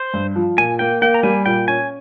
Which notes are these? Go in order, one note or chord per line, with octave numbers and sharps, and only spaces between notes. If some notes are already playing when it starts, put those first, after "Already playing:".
Already playing: C5
G2
F3
A#2 G#5
A#3 G5
A#3 G5
A#5
G3 G#5
A#2 G5
C#4 G#5